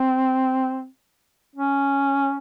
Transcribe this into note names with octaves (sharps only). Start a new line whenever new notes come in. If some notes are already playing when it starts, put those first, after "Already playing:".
Already playing: C4
C#4